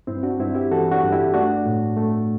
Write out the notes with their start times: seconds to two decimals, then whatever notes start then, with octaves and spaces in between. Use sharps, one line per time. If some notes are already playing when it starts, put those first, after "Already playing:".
0.07 G2 C4 E4
0.23 D4 F#4
0.40 G2 C4 E4
0.55 E4 G4
0.71 E3 F#4 A4
0.91 D4 F#4
1.02 G2
1.12 E4 G4
1.34 A3 D4 F#4
1.66 A2
1.97 A3